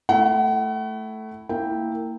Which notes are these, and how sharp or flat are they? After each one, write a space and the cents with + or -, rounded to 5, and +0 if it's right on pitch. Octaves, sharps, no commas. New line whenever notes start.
A3 +0 E4 +0 F#5 +40
A#3 -25 E4 -10 G5 +0